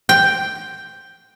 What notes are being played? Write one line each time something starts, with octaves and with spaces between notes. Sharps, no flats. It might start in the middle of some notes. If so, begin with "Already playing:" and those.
G5